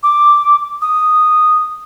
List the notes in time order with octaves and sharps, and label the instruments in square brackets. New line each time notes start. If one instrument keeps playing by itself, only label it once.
[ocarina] D6
D#6